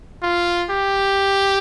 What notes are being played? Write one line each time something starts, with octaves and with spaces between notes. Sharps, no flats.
F4
G4